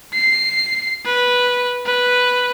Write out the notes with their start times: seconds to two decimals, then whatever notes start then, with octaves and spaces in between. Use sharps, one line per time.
0.14 C7
1.06 B4
1.86 B4